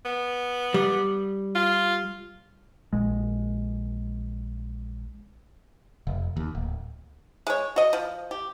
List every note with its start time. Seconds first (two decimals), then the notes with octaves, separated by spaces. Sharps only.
0.05 B3
0.74 G3
1.55 F4
2.93 A#1 G#3
6.07 F1
6.37 D#2
6.55 D1
7.47 G#3 C#5
7.76 F#4 D#5
7.93 F3
8.31 G4